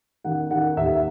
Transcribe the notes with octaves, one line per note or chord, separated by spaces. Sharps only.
D#3 F#5
D#3 F#5
D#2 E5